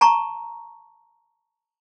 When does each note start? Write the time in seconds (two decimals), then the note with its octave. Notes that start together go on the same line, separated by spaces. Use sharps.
0.01 A5 A#5 C#6